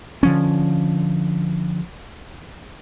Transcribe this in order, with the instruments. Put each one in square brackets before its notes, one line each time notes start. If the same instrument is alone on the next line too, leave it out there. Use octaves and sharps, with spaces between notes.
[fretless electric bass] D3 F3 C#4